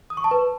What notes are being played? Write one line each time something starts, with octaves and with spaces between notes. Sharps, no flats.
D#6
C#6
A5
B4